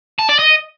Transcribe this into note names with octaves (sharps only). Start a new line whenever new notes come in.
A5
D5
D#5